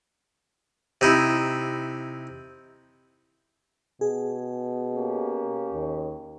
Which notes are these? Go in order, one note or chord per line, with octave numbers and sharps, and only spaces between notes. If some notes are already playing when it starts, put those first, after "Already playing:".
C3 D#4 E4
B2 G#4
A#3 C#4 G4
D#2